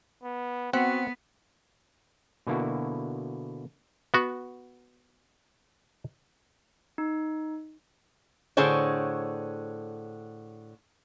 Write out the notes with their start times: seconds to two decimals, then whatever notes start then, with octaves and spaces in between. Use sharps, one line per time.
0.24 B3
0.73 B3 C4 F#4 F#5
2.47 B2 D3 A#3 E4 F#4
4.14 B3 F#4
6.98 D#4
8.57 A2 D3 G#4 C5 C#5